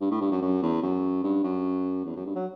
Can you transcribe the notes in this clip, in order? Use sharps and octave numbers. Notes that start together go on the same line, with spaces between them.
G2
A2
G2
F#2
F#2
E2
F#2
G2
F#2
E2
F#2
G2
F#3